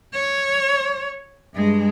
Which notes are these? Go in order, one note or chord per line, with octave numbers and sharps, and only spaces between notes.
C#5
G2 G#3